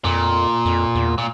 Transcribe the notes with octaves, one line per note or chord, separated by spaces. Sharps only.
F2 A#2
F2
E2
A#2